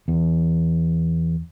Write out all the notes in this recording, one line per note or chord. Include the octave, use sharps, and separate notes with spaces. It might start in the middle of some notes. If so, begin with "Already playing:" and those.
E2